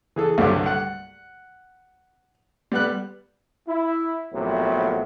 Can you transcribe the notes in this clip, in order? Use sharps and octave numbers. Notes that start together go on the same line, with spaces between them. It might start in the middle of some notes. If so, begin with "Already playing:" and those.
E3 G#4 A4
C2 G2 D3 F#3 F#4 G4
F#5
G3 B3 F#6
E4
A#1 A2 C3 F#3 B3